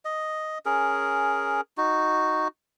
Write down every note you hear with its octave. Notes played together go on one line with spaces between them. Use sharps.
D#5
C#4 G#4 A#4
D#4 F#4